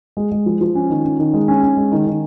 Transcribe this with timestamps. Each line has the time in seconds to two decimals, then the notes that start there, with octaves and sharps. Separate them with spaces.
0.17 G#3
0.32 G#3
0.46 F3
0.61 F3
0.75 C#4
0.90 D#3
1.04 C#4
1.19 D#3
1.34 G#3
1.48 C#4
1.63 C#4
1.77 G#3
1.92 D#3
2.07 D#3